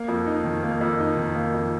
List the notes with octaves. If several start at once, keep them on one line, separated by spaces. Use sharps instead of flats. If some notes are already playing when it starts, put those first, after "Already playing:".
Already playing: A#3
F2
D#4
D#3
A#3
F2
D#4
D#3
A#3
F2